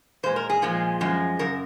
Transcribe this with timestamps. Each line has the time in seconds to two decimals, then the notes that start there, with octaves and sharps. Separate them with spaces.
0.23 A#2 G#3 C5
0.36 A#4
0.50 G#4
0.62 A#2 F3 G#3
1.01 F#2 F3 G#3
1.39 F#2 C#3 A#4